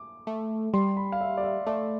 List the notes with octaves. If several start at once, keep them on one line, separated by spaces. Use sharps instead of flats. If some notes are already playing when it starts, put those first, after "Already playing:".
Already playing: D6
A3
G3 C6
B5
F5
E5
D5
E5
A3 D5